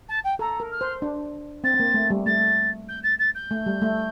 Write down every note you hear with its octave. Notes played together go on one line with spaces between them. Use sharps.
A5
G5
A4 A#5
A#4
F6
C5
D4
C4 A6
C4
A#3
A3
G3
A3 A6
G6
A6
A6
G6
A3
G3
A3